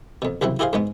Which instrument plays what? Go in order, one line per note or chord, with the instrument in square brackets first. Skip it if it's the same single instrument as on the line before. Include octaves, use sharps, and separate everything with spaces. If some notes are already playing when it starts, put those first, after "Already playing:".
[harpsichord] F2 B2
C2 C#3 F#3 C4 E4
E4 G4 G#4 C5 F5
G#2 G#3 B3